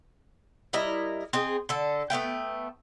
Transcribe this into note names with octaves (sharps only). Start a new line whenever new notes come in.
G3 E4 A#4 D#5
C4 D#4 G#4
D3 A4
A3 B3 F5 G5